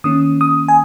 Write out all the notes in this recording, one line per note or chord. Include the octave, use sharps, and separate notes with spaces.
D#3 A#3 C#4 D#6
D#6
G#5